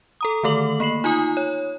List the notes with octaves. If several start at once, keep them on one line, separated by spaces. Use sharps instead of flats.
A4 A#5 D#6
D3 D#3 A3 A4 D6 F#7
A#3 B5 C7 F#7
D#4 F4 G#5 D#6
C#5